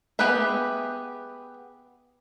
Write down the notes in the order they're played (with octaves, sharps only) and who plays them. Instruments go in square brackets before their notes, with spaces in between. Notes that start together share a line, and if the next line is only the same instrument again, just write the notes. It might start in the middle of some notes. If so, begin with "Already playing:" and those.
[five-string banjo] B3 G4 G#4 B4 E5